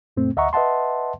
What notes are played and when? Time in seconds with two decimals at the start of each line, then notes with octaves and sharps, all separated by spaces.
0.17 F#2 A#2 A3 C4
0.36 D2 D#5 E5 F#5 A#5 C#6
0.53 B4 D#5 E5 F#5 A5 C6